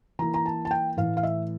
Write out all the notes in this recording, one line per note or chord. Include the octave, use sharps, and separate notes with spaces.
E3 A#3 E4 A#5
A#5
A5
A5
G5
A2 E3 A3 E4 F5
F5
E5